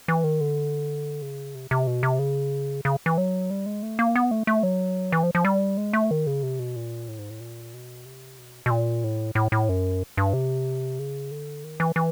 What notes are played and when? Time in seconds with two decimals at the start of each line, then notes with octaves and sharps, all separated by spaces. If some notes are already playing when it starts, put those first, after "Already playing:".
0.08 E3
0.24 D#3
0.41 D3
1.22 C#3
1.55 C3
1.71 C3
1.87 B2
2.03 C3
2.19 C#3
2.85 C#3
3.06 E3
3.18 F#3
3.50 G3
3.66 G#3
3.83 A3
3.99 A#3
4.16 B3
4.31 A3
4.47 A3
4.63 F#3
5.12 E3
5.23 F3
5.35 F3
5.45 G3
5.77 G#3
5.93 A3
6.11 D#3
6.27 C#3
6.43 C3
6.59 B2
6.76 A#2
7.08 A2
7.19 G#2
7.30 A2
7.40 A#2
7.74 B2
8.05 C3
8.39 B2
8.66 B2
8.71 A#2
9.04 A2
9.35 A2
9.52 A2
9.69 F#2
10.17 G2
10.33 C3
10.99 C#3
11.31 D3
11.64 D#3
11.80 E3
11.96 E3